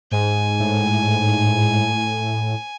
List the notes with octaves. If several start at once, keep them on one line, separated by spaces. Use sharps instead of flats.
G#2 G#5
A2